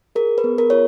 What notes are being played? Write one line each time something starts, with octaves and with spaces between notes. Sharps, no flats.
G#4 A#4
B4
B3
A#4
F4 C#5